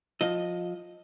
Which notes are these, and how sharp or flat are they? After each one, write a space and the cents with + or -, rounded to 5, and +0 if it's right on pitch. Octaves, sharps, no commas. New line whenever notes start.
F3 +20 D#5 +0